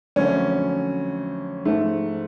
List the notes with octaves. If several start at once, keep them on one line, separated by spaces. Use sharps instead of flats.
F2 D3 F#3 A3 C#4
G#2 F3 A3